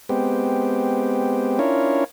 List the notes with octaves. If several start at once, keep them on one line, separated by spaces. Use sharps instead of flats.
G#3 B3 C4 G4
C#4 D4 E4 F4 A#4 C#5